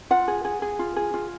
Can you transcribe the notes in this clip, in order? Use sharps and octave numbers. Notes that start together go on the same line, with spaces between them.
F4 F#5
G#4
G#4
G#4
F4
G#4
F4